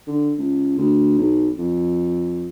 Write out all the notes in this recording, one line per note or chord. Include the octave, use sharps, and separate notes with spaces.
D3
C#2
D2
B1
F2